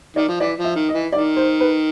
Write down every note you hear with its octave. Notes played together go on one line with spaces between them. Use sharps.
D#3 D5
F3
E3 D5
F3
E5
D#3
D#5
E3
D#3 D5
C5
B4